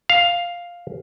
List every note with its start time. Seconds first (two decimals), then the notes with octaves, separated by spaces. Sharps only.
0.10 F5